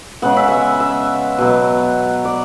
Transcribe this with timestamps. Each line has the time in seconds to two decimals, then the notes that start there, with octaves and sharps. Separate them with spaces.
0.22 C#3 G#3 B3 F#5
0.37 E5
0.48 E5 F#5
0.80 E5
1.38 B2 F#3 B3
2.25 D5